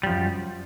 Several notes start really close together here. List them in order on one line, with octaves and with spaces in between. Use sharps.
G3 F3 F#2